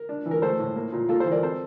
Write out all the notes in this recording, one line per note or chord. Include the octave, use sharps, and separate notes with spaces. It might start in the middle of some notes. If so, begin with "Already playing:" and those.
Already playing: A#4
D4
E3
A#4
A3 A4 C5
A2
A#3
A#2
A#3 F4 A4
A4 C5
E3
A#4 D5
C4 A4 C5